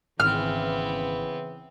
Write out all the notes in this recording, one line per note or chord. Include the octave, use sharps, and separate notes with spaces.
G#1 C#3 E3 B3 C4 F6